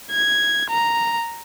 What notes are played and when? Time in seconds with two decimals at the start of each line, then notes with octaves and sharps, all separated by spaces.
0.11 G#6
0.70 A#5